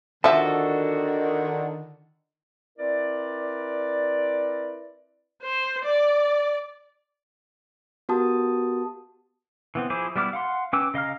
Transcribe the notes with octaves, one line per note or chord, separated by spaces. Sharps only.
D3 D#3 F3 D4 F#4 A4 E5
C4 E4 A#4 B4 D5
C5
D5
B3 F#4 G4 A#4 A5 D#6
E3 B3 C4
F3 E4 G#4 C5 D6
G3 B3 E4 D6 F6
F5 F#5 C6
C#4 B4 G5 D6 E6
C#3 D#5 F5 A#5 F6